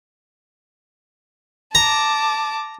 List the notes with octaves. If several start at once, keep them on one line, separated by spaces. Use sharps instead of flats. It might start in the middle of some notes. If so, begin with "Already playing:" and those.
A5 A#5 D6